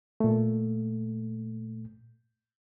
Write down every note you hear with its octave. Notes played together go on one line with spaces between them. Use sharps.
A#2 A3